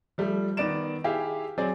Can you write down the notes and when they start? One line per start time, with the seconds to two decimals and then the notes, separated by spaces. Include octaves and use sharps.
0.18 F3 G3 A3
0.57 D#3 B3 D5 D7 E7
1.04 E4 G4 G#4 F5
1.58 F#3 C4 G#4 D5